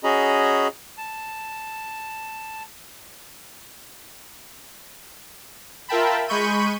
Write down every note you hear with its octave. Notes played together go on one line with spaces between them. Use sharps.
C#4 F#4 G#4 D#5 A#5 B5
A5
F4 A#4 E5 G5 A5 B5
G#3 B5 C#6 G6 D#7